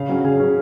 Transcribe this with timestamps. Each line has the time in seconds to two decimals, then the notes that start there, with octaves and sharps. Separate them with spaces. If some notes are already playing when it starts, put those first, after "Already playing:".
Already playing: C#3 F5
0.09 F#3 C#4
0.24 C#3 G#4
0.40 F#3 C#4